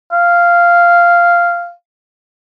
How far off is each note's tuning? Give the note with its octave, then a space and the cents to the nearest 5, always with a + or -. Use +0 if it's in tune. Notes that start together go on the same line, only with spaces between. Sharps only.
F5 -5